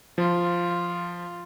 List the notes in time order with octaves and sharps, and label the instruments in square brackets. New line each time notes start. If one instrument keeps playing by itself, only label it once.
[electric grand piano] F3 [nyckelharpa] F4